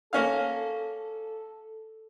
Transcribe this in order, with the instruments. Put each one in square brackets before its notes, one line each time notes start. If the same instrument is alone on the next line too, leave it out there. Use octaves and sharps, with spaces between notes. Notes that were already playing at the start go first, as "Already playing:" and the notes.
[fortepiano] A#3 C#4 F5 [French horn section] A4